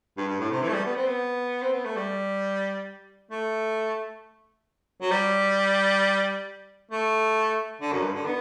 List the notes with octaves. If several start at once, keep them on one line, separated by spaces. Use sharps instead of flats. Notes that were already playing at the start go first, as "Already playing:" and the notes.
G2
G2
A2
C3
E3
A3
G3
B3
C4
B3
C4
B3
A3
G3
A3
F#3
G3
A3
D3
F#2
G2
D3
B3